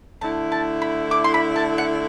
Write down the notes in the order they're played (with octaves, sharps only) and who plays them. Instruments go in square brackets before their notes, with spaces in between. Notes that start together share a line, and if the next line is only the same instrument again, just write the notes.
[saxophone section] D3 A3 E4 [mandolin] A5
[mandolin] A5
B5
D6
C6
B5
A5
F#5